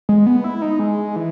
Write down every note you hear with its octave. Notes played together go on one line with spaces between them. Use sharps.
G#3
B3
E4
D#4
G#3
E3